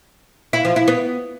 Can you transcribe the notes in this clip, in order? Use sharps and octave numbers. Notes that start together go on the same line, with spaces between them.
E4
F3
E4
B3